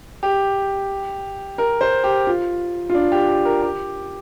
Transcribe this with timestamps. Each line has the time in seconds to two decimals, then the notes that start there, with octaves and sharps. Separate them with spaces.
0.23 G4
1.58 A#4
1.81 C5
2.04 G4
2.27 F4
2.90 F4
2.94 D4
3.12 G4
3.29 G4
3.45 A#4
3.63 G4